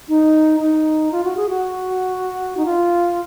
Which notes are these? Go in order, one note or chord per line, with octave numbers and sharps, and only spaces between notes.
D#4
D#4
F4
F#4
G#4
F#4
D#4
F4